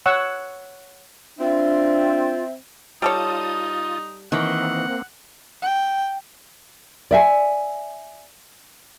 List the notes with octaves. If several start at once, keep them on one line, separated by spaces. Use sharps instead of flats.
C#5 F#5 C#6 E6
C4 D4 F4 E5
G3 D#4 F4 A4 C#5 D#6
D#3 E3 A#3 C4 F#5
G5
D5 E5 G#5